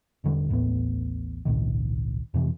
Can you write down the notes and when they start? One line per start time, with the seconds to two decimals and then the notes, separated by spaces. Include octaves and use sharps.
0.24 E1 E2 D3 G3
0.49 A1 D#2 A2 B3
1.45 G#1 C#2 A#2 D#3
2.34 F2 C3 E3